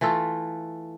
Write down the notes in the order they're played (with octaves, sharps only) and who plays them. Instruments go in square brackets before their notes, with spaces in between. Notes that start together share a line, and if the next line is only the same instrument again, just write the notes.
[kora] E3 A3 F4 A4